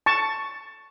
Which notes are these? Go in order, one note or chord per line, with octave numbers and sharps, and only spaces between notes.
A5 C#6